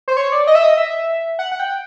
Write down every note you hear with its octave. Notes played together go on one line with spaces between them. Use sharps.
C5
C#5
D5
D#5
E5
D#5
E5
F#5
F#5
G5